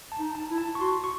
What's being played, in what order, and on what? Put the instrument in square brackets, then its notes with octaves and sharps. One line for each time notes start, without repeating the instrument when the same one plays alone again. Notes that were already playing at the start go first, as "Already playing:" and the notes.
[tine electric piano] A5
[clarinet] D#4
[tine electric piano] A5
[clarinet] E4
[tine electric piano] A5
C#6
[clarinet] F#4 [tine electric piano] C6
[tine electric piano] C#6